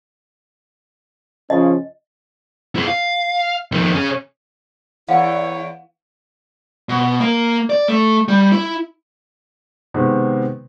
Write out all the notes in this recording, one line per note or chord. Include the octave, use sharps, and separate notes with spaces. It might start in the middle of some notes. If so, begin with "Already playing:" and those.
C#3 F3 C#4 D#5
E4 G#4
F5
F2 D#3
C#4 G#4
E2 E4 C#5 F5 F#5
B2
A#3
D5
A3
G3
E4
C3 D#3 G#3 B3